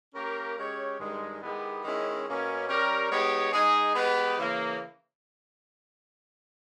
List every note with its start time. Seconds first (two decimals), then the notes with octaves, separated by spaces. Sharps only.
0.14 A#3 C#4 G4 A#4
0.56 G#3 C#4 G4 C#5
0.98 G2 D#3 G#3
1.41 D#3 G#3 B3 E4 G4
1.83 D#3 G#3 C#4 E4
2.26 B2 A#3 C#4
2.67 G3 C#4 G4 A#4
3.10 G#3 B3 D#4 G4 C#5
3.52 G#3 D#4 G#4
3.94 G#3 B3 G4 B4
4.37 C#3 E3 A#3